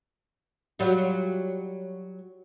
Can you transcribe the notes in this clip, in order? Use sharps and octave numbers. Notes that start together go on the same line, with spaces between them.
F#3 G3 F4